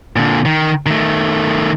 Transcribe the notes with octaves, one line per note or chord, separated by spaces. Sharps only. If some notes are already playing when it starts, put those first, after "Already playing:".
A#2 D3
D#3
D#3 A3